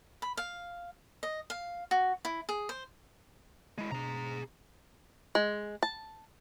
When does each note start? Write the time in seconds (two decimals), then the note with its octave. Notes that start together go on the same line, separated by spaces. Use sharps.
0.22 B5
0.37 F5
1.23 D#5
1.50 F5
1.91 F#4
2.25 E4
2.49 G#4
2.69 C5
3.78 G#3 E4
3.92 B2 D4 G#4 A#5
5.35 G#3
5.83 A5